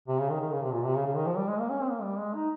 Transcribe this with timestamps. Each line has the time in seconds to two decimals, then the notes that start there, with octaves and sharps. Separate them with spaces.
0.08 C3
0.19 C#3
0.30 D#3
0.40 D#3
0.52 C#3
0.62 C3
0.73 A#2
0.84 C3
0.95 C#3
1.06 C#3
1.15 D#3
1.26 F3
1.38 G3
1.49 G#3
1.60 A#3
1.70 C#4
1.81 C4
1.91 A#3
2.02 G3
2.19 G#3
2.35 D#4